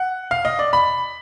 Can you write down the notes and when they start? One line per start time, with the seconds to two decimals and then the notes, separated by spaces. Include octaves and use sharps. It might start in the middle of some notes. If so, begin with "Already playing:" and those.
Already playing: F#5
0.31 F5
0.45 D#5
0.59 D5
0.73 B5